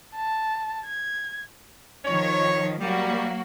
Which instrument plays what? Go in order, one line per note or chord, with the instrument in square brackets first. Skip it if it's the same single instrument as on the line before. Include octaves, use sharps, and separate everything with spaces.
[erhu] A5
G#6
[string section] D#3 F3 [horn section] C#5
[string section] F#3 A#3 F#4 [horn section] G3